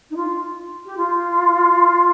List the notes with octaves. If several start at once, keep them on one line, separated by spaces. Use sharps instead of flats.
D#4
F4
G4
F4